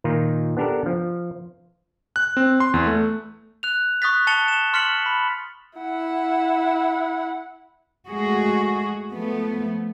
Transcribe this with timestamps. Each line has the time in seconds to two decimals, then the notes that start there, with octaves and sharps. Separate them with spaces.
0.04 A#2 D#3 D#4 F4
0.57 B3 D4 G4 A4 A#4
0.86 F3
2.16 F#6
2.37 C4
2.60 C6
2.74 E2
2.87 A3
3.63 F#6 F7
4.02 C#6 D#6 F#6 A6 B6
4.27 A5 A6 C#7 F7 G7
4.48 E7 G7
4.73 C6 F6 A6 B6 C#7 F#7
5.06 B5
5.79 E4 F#5
8.08 G#3 A3 F#4 G#4
9.13 F3 A3 B3